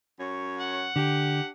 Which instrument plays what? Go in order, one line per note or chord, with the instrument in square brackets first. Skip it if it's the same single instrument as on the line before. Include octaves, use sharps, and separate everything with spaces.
[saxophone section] F#2 C#5
[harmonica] F#5
[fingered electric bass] D3 [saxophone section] D4 G4